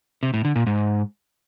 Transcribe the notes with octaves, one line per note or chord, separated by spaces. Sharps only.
C3
A2
D3
A#2
G#2